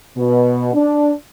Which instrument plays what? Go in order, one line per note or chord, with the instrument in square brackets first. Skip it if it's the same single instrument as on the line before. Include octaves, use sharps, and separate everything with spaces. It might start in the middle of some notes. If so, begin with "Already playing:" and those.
[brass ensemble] B2
D4